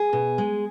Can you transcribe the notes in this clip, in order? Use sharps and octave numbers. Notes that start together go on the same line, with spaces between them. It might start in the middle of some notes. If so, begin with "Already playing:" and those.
Already playing: G#4
B2
G#3